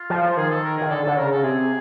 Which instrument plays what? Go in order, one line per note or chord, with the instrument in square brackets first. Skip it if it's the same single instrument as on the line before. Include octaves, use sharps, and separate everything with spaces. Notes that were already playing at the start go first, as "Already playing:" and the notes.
Already playing: [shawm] F4
[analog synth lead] F3
[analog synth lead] D#3 [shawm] G#4
[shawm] A4
A#4
[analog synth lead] D#3 [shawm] G#4
[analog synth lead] D3 [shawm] A4
[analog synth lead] D3 [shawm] A4
[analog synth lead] C#3 [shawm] A#4
[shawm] A4
[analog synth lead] C3 [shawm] G#4